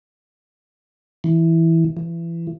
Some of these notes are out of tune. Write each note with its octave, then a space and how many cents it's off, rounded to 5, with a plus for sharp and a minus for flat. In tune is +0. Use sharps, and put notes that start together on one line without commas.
E3 -5
E3 +25